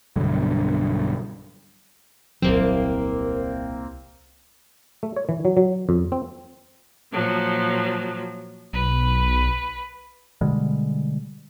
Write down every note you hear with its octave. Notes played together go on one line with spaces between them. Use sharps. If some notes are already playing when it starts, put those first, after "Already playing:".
B1 G2 D3
D#1 C2 F#3 A#3 C4
A3
C#5
E3
F#3
F#3
F2
C4
A#2 F3 F#3
B1 B4
B2 D3 G3 G#3